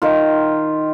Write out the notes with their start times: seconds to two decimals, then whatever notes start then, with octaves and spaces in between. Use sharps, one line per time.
0.02 D#3 F4